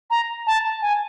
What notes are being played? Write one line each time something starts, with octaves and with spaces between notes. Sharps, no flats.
A#5
A5
G#5